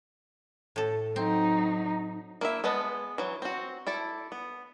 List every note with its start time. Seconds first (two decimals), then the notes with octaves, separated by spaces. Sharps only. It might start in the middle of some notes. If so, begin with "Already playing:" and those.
0.76 A2 A4
1.16 F#3 C4 D#4
2.41 A#3 E4 E5
2.64 G#3 B3 B4 D#5 A5
3.18 E3 F#3
3.42 C4 F#4
3.87 E4 A4 D5
4.32 B3